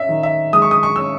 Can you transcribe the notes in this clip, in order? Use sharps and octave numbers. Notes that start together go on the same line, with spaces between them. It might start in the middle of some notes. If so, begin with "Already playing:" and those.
Already playing: C#4 E5
D#3
E5
G#3 D#6
C#6
D#6
C#6
C#4 E6